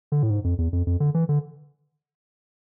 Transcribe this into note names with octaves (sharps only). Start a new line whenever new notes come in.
D3
A2
G#2
F2
E2
F2
F2
D3
E3
D3